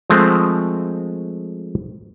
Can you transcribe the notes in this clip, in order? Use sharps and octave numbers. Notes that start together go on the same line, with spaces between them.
F3 G#3 A3 C4